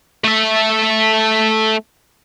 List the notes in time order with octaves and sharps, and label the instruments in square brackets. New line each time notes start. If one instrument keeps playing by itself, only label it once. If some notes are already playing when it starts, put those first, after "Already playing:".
[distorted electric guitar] A3 E5